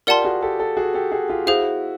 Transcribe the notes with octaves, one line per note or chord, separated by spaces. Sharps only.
F4 G4 A#4 D5 F#5 A5 C6
F#4 G#4
G4 A4
G4 A4
F#4 G#4
G4 A4
F#4 G#4
F4 G4
E4 F#4 G#4 C5 F5